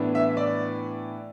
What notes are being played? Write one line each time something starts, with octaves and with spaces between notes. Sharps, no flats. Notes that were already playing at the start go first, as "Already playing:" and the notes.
Already playing: A2 E3 B3 D4
E5
D5